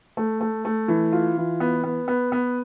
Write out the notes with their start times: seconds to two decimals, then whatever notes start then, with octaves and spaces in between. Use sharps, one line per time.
0.17 A3
0.41 A3
0.65 A3
0.88 E3
1.12 F4
1.37 E3
1.60 B3
1.84 B3
2.08 B3
2.32 B3